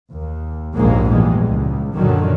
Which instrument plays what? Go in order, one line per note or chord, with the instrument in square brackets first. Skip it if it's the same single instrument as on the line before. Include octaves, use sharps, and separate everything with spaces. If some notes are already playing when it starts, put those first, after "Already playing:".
[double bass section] D#2
A#1 D#2 G#2 G#3 A#3
E2 G3 G#3
C#2
F#2 A#2 D3 D#3 F#3